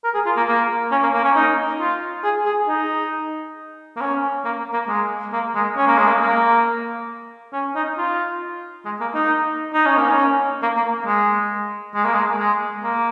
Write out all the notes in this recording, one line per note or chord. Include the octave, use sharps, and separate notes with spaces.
A#4
G#4
F4
A#3
A#3
C#4
A#3
A#3
C#4
D#4
F4
G#4
G#4
D#4
A#3
C#4
A#3
A#3
G#3
A#3
G#3
C#4
A#3
G#3
A#3
A#3
C#4
D#4
F4
G#3
A#3
D#4
D#4
C#4
A#3
C#4
A#3
A#3
G#3
G#3
A#3
G#3
G#3
A#3